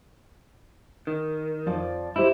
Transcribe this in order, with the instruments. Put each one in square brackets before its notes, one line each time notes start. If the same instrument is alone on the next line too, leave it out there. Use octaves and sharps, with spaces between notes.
[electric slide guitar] D#3
[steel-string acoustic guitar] F2 F3 D5
[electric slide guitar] E4 [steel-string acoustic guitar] G4 C5 D#5